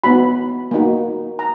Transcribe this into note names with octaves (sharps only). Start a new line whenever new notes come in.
B3 D#4 F#4 B5
A#3 D#4 F#4
A#5